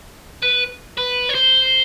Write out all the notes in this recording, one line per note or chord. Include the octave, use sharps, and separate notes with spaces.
B4
B4
C#5
C5